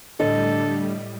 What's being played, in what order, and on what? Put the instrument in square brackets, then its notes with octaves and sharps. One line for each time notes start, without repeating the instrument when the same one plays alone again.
[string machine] A2 G3 [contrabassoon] D3 [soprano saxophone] A4 [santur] D#5